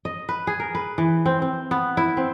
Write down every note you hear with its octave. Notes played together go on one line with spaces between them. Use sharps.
D#5
B4
G#4
A#4
B4
E3
C4
C4
B3
E4
C4